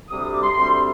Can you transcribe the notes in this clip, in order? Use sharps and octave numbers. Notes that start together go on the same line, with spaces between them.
D2 C3 G3 C4 D#6
D#6
D6
C6
D2 C3 G3 C4 C6